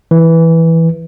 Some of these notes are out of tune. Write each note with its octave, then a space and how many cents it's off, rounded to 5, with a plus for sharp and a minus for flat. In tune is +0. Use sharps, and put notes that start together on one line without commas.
E3 -5